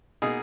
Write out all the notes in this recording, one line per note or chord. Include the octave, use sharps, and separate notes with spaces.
B2 A#3 D#4 G#4